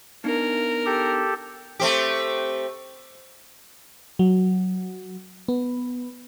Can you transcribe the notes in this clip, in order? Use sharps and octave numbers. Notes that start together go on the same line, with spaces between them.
B3 D4 D#4 A#4
G4 A4
A3 C4 G4
F#3
B3